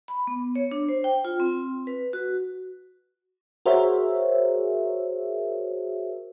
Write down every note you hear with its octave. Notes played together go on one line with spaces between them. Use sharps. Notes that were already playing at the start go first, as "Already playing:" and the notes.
B5
B3
C#5
D4
C5
G5
F4
C4
B4
F#4
F#4 G#4 A#4 C5 C#5 E5